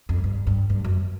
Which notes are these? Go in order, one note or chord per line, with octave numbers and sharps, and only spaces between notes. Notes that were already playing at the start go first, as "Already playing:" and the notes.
F2
G2
G2
G2
F#2